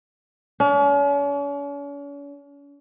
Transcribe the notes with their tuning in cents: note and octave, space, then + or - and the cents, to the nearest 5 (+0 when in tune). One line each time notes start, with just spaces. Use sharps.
C#4 +45